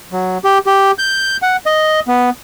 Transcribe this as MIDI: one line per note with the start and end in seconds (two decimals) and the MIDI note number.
0.12 0.38 54
0.44 0.58 67
0.66 0.91 67
0.98 1.37 91
1.42 1.57 78
1.66 2.00 75
2.08 2.30 59